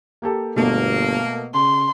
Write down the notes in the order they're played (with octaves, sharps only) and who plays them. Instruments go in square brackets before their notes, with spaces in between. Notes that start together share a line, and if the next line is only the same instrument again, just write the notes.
[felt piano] A#3 G4 A4
[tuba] G1 [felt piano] B2 A3 [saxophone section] A#3
[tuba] C#3 [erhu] C6